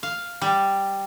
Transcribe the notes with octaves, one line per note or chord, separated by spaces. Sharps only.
F5
G3